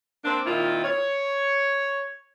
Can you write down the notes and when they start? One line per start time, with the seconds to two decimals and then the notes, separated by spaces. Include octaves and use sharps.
0.25 A#3 C4 D4
0.45 A#2 D#3 C4 E4 F4
0.84 C#5